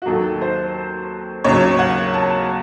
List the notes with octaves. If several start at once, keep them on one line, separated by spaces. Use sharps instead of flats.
F#4
D#2 D#3 F#3 A4
C5
D#2 C#3 F#3 C#5
F#5
A5